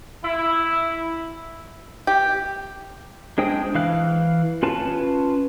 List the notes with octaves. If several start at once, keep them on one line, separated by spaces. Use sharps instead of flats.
E4
G4
G#3 D4 C5 G5 D#6
E3 F5 F#6
C#4 F4 B4 A5